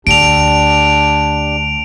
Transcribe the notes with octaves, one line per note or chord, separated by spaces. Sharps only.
D2 D4 G4 D7 F7